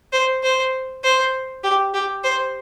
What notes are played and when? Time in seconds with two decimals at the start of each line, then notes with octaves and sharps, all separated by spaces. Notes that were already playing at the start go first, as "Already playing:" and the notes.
0.12 C5
0.43 C5
1.03 C5
1.63 G4
1.94 G4
2.24 C5